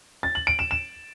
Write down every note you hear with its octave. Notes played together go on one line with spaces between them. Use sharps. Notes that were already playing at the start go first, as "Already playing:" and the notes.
A6
F#7
D7
E7
E7